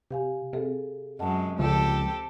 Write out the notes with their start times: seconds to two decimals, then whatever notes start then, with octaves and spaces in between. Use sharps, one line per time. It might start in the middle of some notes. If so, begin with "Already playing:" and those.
0.11 C3 G4 F5 G#5
0.53 C3 C4 G#4 A4
1.19 F#2 G#3 D#5 F#5 A5
1.59 C#2 F3 C4 G4 A4